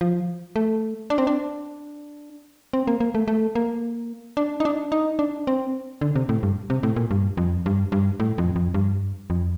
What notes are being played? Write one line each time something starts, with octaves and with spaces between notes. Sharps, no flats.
F3
A3
D4
C4
D4
C4
A#3
A#3
A3
A3
A#3
D4
D#4
D4
D#4
D4
C4
D3
C3
A2
G2
C3
A2
A#2
G2
F2
G2
G2
A2
F2
F2
G2
F2